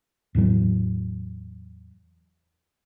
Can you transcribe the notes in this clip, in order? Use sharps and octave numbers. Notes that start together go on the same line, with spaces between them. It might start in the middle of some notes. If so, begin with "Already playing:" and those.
E2 A2 E3 F#3